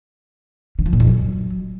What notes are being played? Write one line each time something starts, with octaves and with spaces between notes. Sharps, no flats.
D3
F3
A#2
F2
F#3